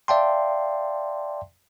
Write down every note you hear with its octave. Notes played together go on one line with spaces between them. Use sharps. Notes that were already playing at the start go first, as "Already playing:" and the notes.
D5 E5 F5 G5 A5 C6